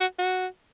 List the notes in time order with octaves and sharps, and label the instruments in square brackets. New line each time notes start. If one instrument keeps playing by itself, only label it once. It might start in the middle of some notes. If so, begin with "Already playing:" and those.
[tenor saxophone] F#4
F#4